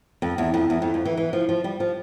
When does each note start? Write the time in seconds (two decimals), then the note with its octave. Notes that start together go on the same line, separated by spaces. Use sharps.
0.22 F2
0.38 E2
0.54 F2
0.70 E2
0.82 F2
0.94 F2
1.05 E3
1.17 E3
1.33 F3
1.49 F3
1.64 G3
1.80 F3